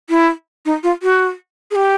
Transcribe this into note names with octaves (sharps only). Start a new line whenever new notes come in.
E4
D#4
F4
F#4
G#4
G4